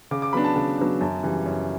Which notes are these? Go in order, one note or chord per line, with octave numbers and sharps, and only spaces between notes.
C#3 D6
D6
F#3 B3 D4 B5
A5
C#3
F#3 B3 D4
F#2 A5
C#3 E3 G3
F#2